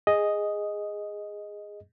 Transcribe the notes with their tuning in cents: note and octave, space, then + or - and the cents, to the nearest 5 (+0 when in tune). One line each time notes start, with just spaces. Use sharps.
G#4 -10 D#5 +0